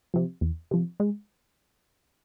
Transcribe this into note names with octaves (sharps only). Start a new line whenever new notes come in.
C3 F3
E2
C3 F3
G#3